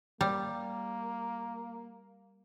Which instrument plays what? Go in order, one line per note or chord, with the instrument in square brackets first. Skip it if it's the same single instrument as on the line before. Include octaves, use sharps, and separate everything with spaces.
[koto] G3 [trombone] A#3